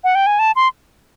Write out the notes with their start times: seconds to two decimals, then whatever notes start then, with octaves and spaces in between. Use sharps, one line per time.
0.04 F#5
0.15 G5
0.27 G#5
0.39 A5
0.56 C6